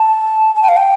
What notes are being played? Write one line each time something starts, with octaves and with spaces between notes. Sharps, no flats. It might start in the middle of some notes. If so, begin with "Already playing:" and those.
Already playing: A5
A5
G5
F5
G5